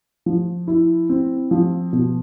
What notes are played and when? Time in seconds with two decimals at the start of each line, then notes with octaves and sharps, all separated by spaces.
0.26 F3
0.67 E4
1.09 C4
1.51 F3
1.93 B2